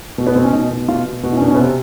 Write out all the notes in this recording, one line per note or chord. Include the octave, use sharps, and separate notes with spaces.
B2
B3
B2 C4
C#4
B2 D#4
B2
B2 F4
B2
B2 F#4
E4
C#4
B2 D4
C#4
B3
C3 C4